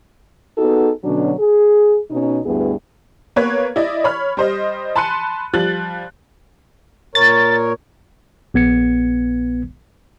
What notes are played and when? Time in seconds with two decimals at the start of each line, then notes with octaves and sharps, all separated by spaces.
0.58 B3 D#4 F#4 G#4 A4
1.04 B2 D3 F#3 C#4 D4
1.39 G#4
2.11 B2 C#4 D#4
2.46 D2 G2 B3 E4 G#4
3.36 A#3 B3 B4 C#5 G#6
3.76 E4 D5 D#5
4.04 C#5 B5 F6
4.37 G3 C5 D#5
4.96 A5 B5 C6 F#6 C#7 D#7
5.53 F3 G3 F#6 A6 F#7
7.15 A#2 A#4 C#5 A6
8.54 A#1 B3 G#6 C#7